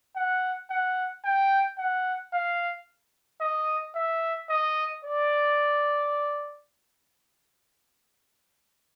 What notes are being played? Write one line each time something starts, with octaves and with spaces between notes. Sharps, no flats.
F#5
F#5
G5
F#5
F5
D#5
E5
D#5
D5